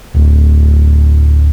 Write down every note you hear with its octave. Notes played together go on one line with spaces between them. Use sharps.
D1